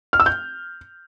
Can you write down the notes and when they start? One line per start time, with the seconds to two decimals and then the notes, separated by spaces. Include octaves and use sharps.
0.13 F6
0.20 E6
0.26 G6